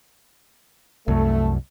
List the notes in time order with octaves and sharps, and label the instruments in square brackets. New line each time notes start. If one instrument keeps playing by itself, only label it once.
[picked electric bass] C2 F#2 [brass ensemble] A3